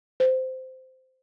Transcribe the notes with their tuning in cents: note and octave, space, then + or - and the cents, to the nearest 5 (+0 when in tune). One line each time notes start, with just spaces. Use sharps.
C5 -15